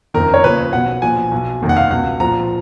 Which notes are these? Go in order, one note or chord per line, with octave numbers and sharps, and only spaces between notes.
F#1 F2 D#3 A#4
C#5
D#2 C#3 F3 B4
B1 B2 F#5
A#1 A#2 F3 G#5
B1 B2
F1 D#2 D#3
F#5
F5
C#2 B2 F#5
A#1 A#2 F3 A#5